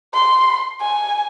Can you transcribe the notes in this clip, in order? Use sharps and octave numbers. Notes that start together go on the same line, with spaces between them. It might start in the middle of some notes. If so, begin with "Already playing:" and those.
C6
G#5